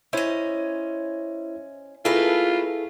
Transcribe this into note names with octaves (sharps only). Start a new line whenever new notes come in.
C#4 E4 C5 D#5 E5
A3 A#3 E4 F4 G#4 A4 B4